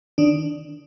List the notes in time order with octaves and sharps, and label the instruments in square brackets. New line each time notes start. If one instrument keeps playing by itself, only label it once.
[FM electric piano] D#3 D4